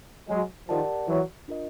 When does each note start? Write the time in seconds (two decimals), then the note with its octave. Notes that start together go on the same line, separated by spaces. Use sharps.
0.29 F#3 G#3
0.68 D#3 F3 G4 A#4 D5 F#5 A5
1.08 E3 F#3
1.48 D4 F4 A#4 D#5